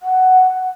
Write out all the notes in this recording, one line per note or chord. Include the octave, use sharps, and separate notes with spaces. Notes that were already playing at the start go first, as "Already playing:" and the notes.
F#5